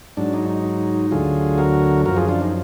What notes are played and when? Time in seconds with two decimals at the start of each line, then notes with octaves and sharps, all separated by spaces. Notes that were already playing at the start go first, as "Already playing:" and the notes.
0.17 G#2 F#3 D4
0.33 D#4
0.49 D#4
1.11 D2 D3 F#3 F4 G#4
1.58 F#4 A#4
2.05 F#2 F3 F#4 A#4
2.17 F4 G#4
2.29 D4 F4
2.41 D#4